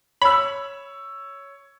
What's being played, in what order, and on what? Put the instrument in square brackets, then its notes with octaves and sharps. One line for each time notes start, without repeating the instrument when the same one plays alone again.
[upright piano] C#5 E6 [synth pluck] B5